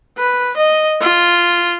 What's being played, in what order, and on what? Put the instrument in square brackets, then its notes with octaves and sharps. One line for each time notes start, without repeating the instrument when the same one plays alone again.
[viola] B4
D#5
F4